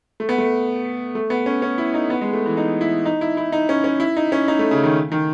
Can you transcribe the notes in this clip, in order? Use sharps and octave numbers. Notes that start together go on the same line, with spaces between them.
A3
B3
A3
A3
B3
C#4
C#4
E4
D#4
B3
G#3
A3
E3
D#4
E4
D#4
E4
E4
D#4
C#4
C#4
E4
D#4
C#4
D#4
A3
C#3
D#3
D#3